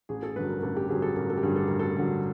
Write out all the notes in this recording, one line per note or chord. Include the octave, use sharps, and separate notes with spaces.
A1 G#4
A4
G2 D3 F#3 B4
A#4
A1 A4
G4
G2 D3 F#3 G#4
A4
A1 A#4
A4
G4
G2 D3 F#3 G#4
A4
A1 A#4
A4
G2 D3 F#3